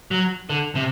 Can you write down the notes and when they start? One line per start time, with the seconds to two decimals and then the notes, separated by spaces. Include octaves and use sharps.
0.11 F#3
0.50 D3
0.75 C3